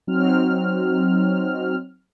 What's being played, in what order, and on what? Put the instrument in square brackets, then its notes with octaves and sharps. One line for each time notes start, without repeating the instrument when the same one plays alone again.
[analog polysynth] F#3 C4 D#4 F6